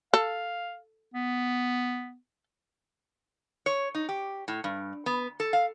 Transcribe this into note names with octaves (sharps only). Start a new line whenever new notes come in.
A4 F5
B3
C#5
D#4
G4
A2
G2
B3
A4
F5